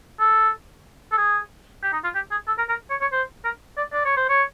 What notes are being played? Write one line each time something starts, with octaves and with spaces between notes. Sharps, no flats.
A4
A4
G#4
G4
D#4
F4
G4
G#4
A4
A#4
A#4
C#5
C#5
C5
A#4
D5
D5
C#5
C5
C#5